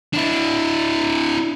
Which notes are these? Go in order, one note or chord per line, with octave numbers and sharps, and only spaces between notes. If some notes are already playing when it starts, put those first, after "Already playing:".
D4 E4